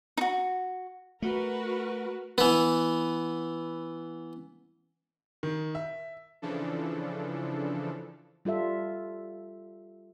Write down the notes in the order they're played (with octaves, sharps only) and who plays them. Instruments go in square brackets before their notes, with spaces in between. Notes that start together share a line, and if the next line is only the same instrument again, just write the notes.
[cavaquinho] D#4 F#4
[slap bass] A3 [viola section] F#4 A#4 B4
[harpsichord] E3 B3
[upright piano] D#3
E5
[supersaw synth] C#3 E3 F3 D4 A4
[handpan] G3 F4 A4 E5